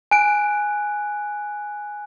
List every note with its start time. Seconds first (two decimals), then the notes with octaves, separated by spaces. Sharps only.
0.11 G#5 F#6 D7